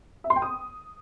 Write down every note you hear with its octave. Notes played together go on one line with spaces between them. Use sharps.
E5
C6
G5
D#6